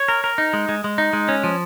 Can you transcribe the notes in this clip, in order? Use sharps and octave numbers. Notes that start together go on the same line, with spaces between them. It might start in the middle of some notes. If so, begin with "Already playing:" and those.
Already playing: C#5
A#4
A#4
D#4
G#3
G#3
G#3
D#4
G#3
C#4
F3